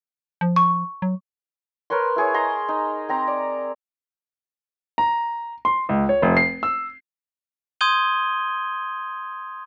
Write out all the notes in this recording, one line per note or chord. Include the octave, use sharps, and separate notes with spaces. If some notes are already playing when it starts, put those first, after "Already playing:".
F3
C#6
F#3
A#4 B4 C#5 C6
E4 G#4 C#5
D#5 A#5 C6
D#4
C4 A#5 C6
D5
A#5
C6
C#2
C#5
F1
C7
E6
C6 D#6 G6 G#6 D#7 G7